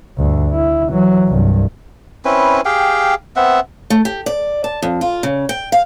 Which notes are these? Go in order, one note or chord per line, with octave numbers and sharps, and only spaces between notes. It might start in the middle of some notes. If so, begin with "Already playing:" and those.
D2 G2
E4
E3 F#3
C2 G2
C4 C#4 E4 B4
G4 G#4 F5 G5
B3 C4 E5 F#5
A3
G4
D5
A5
F2
F4
C#3
G5
F5